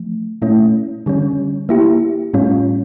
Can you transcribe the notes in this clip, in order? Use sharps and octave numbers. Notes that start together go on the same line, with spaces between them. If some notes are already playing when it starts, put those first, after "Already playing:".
Already playing: F3 A3
A#2 A3 C#4 E4
D3 G3 C#4
A#3 E4 G4
A2 G3 C#4 F4